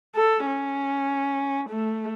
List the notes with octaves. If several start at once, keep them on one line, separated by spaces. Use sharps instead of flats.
A4
C#4
A3